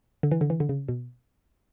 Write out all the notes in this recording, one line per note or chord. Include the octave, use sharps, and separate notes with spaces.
D3
E3
D3
E3
D3
C#3
B2